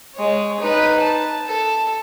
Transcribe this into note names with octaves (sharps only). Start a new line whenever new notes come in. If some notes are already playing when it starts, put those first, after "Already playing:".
G#3 C#5
D#4 B4
A5
A4